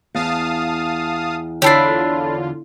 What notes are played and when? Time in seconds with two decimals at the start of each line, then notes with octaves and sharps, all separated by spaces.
0.15 E2 F5 A5 D#6
1.62 D3 D4 E4 F4 G4 C#5 A5 C7